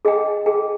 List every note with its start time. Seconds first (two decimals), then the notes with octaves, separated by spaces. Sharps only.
0.05 G#4 D#5 G5
0.46 G#4 D#5 G5